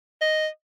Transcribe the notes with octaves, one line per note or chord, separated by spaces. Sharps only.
D#5